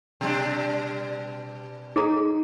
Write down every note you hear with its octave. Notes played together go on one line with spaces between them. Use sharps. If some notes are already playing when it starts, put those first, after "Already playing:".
B2 G3 D4
D#4 G#4 A4 A#5